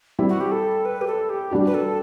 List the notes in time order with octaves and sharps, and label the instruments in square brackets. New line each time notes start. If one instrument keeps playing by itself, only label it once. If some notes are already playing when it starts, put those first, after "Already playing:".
[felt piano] G3 C4 E4
[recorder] F#4
G4
A4
B4
G4
A4
G4
[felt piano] G3 D4 F#4
[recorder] B4
A4